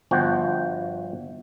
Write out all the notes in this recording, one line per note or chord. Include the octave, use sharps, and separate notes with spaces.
G1 F3 F#4 G5